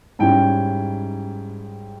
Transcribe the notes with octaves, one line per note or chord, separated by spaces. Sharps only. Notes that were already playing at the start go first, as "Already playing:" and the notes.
G#2 G3 C#4 E4 G5